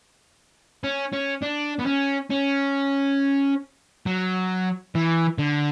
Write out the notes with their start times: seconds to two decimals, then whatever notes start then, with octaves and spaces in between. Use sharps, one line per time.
0.84 C#4
1.13 C#4
1.43 D4
1.80 B3
1.87 C#4
2.31 C#4
4.06 F#3
4.95 E3
5.38 D3